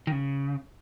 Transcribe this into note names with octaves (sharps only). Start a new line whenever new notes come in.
D#3
C#3